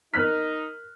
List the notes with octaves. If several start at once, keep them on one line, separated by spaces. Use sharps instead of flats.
D#4 A#4 F6 F#6 B6